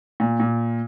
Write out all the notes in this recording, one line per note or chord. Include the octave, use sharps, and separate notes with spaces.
A#2
A#2